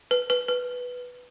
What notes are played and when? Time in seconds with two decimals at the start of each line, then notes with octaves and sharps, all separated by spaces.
0.11 B4
0.30 B4
0.48 B4